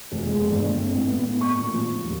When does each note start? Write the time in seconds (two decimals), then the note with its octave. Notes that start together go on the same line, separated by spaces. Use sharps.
0.11 F1
0.25 G#3
0.51 G1
0.64 A#3
0.77 C4
0.94 A2
1.08 B3
1.23 A2
1.41 C#6
1.58 A#2
1.73 F3
2.04 D#2